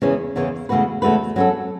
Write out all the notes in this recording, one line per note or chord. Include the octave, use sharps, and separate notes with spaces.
E2 C#3 E3 C#4
E2 C#3 E3 C#4
E2 C#3 A3 F#4 B4
E2 C#3 A3 F#4 B4
F#3 C#4 A4